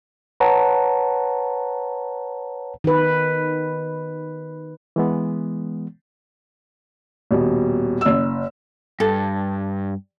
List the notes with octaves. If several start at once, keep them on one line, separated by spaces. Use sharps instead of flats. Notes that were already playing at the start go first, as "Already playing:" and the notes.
B4 C#5 F#5 A5 A#5
D#3 B4
E3 G#3 B3
D#1 B2
F#1 E6
G2 A4